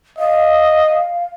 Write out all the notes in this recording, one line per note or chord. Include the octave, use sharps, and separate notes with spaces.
D#5 F5